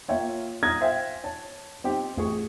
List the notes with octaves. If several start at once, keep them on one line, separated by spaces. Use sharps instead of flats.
A#3 F4 C#5 E5 F5 G5
A#5 D#6 F6 F#6 G#6 A#6
C5 E5 F5 G5 G#5
C#5 A5
C4 D#4 G4
A1 G#4 C#6